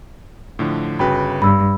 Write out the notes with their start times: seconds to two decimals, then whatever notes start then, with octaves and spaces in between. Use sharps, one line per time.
0.59 A2 D3 F3
0.99 G1 C#3 F#4 B4 G5 B5
1.42 G2 B5 E6